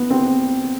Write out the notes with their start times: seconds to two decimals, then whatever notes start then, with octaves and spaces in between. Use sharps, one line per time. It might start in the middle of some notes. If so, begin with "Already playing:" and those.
Already playing: B3
0.11 C4